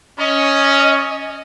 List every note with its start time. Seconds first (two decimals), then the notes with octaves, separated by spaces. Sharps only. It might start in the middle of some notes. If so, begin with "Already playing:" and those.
0.18 C#4 D#5